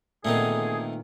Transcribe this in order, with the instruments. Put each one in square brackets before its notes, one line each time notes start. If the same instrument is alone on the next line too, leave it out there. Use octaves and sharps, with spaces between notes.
[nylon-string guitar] A#2 D#3 B3 [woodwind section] D3 G#4 [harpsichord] A3 C4 D#4